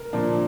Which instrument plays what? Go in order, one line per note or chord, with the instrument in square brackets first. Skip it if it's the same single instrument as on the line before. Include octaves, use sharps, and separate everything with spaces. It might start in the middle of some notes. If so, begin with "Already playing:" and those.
Already playing: [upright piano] A#4
[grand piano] A#2 F3 A#3 D4